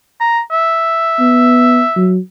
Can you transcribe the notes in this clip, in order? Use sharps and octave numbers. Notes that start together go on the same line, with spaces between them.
A#5
E5
B3
F#3